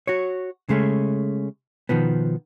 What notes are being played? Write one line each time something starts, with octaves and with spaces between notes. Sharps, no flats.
F#4 C#5
C#3 G#3 A3 C#4
B2 D#3 F3 B3